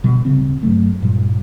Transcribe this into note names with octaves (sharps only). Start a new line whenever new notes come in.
B2 G3
D1 C#3 C4
G2 F#3 A3
G2 A#2 G3